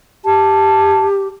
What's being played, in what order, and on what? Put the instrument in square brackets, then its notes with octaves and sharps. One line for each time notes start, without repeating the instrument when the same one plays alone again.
[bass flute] G4 [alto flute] A5